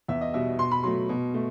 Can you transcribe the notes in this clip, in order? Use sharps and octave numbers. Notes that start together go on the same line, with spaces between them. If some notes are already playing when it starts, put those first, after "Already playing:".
E2 E5
D#5
B2 G3 E5
B2 C6
B5
F#3 A3 C6
B2
A3